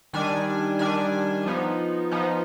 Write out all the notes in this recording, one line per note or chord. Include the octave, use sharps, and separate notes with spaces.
D#3 G3 D4 G#5
D#3 G3 D4 G#5
F3 B3 D#4
F3 B3 D#4